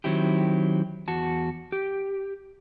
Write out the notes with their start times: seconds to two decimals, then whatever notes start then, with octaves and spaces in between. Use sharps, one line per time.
0.04 D#3 F#3 C4 E4 G4
1.08 E2 F#4 A5
1.72 G4